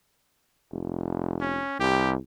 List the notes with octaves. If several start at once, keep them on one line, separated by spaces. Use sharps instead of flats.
F1
C#4
C2 G4